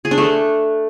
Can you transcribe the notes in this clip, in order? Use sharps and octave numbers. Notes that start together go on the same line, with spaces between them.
G#4
D4
A3